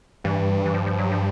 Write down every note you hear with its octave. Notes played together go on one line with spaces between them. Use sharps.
G2 E3
E3
F3
F3
F#3
F3